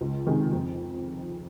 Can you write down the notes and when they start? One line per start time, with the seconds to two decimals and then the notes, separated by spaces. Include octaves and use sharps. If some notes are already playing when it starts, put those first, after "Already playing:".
0.01 C#2
0.26 C3 D#3 G#3
0.53 F2